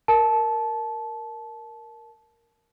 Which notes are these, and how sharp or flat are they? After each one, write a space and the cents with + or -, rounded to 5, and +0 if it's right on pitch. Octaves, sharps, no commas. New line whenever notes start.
A#4 +0 A5 -20